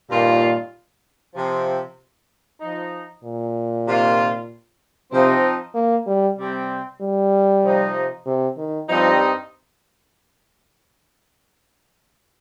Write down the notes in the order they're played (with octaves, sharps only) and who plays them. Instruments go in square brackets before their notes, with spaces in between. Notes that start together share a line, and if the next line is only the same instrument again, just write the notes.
[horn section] G2 D#3 A#3 F4 [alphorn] A#2
[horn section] C3 F3 C4
F3 D#4
[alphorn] A#2
[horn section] C3 D#3 A#3 F4
[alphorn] C3 [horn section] F3 C4 D#4
[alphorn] A#3
G3
[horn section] C3 G3 C4
[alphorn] G3
[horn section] C3 F3 D#4
[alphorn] C3
D#3
[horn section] G2 G3 C4 D#4 [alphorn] F3